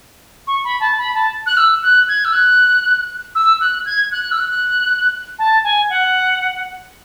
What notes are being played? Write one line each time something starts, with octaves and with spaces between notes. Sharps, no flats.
C#6
B5
A5
B5
A5
F#6
E6
F#6
G#6
E6
F#6
E6
F#6
G#6
F#6
E6
F#6
A5
G#5
F#5